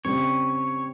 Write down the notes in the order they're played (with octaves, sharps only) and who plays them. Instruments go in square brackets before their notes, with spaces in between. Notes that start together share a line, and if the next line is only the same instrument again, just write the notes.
[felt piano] C#3 G3 C4 [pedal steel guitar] C#5